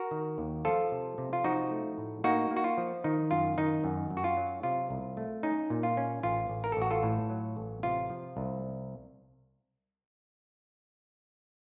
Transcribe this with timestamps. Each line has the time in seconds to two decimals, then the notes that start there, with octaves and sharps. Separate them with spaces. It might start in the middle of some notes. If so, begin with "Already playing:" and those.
Already playing: F#4 A#4
0.11 D#3
0.38 D#2
0.65 F3 F4 A4
0.91 C3
1.18 C3
1.33 F4
1.44 F3 D#4 F#4
1.71 A3
1.98 A2
2.24 A#3 D#4 F#4
2.51 A#3
2.57 F#4
2.64 F4
2.78 F3
3.04 D#3 D#4
3.31 F#2 F4
3.58 D#3 D#4
3.84 F#2
4.10 F#2
4.17 F#4
4.24 F4
4.37 F#3
4.63 C3 F4
4.90 C2
5.17 A3
5.43 C#4 D#4
5.70 A#2
5.83 F4
5.97 C#4
6.23 A1 F4
6.49 A1
6.64 A#4
6.72 A4
6.77 A1 F#4
6.91 F4 A4
7.03 A2
7.30 F#3
7.57 A1
7.83 C3 F4
8.10 F3
8.37 C2